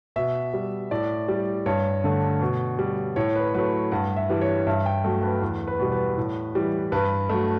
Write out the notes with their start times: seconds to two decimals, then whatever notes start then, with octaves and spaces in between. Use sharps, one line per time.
0.16 B2 E5
0.54 G3
0.91 A2 D5
1.28 G3
1.66 G2 C#5
2.04 D3 A3
2.42 B2
2.79 G3
3.16 A2 C#5
3.36 B4
3.54 F#3 A3 B4
3.91 G2 F#5
4.16 E5
4.29 E3 G3
4.41 C#5
4.67 G2 E5
4.86 G5
5.04 F#3 A3
5.23 B4
5.42 E2
5.67 B4
5.79 B2 G3
5.92 B4
6.17 A2
6.55 E3 G3
6.92 G2 B4
7.29 F#3 A3